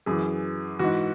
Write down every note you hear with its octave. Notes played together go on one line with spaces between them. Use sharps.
F#2 E3 G#4
G#2 E3 F#4